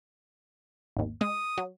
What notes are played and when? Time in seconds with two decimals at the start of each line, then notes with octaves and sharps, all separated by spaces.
0.97 G#1 D#2
1.21 G#3 D#6
1.58 F#3